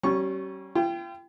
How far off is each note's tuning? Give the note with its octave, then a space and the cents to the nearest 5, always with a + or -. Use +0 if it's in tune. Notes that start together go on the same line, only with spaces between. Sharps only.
G3 -40 C#4 -20 C#6 +0
F4 -45 G5 +0